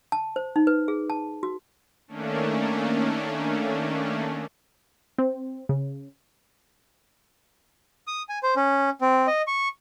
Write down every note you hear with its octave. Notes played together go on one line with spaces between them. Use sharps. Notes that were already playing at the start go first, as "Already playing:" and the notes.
A5
C5
D#4
B4
G#4
A5
F#4
D#3 A3 A#3 C#4 D4
C4
C#3
D#6
G#5
C5
C#4
C4
D#5
C#6